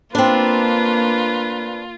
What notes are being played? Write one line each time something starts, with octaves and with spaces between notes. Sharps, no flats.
A#3 C4 D4 F4 B4